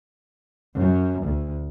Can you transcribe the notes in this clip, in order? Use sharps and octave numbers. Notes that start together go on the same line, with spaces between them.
F#2
D2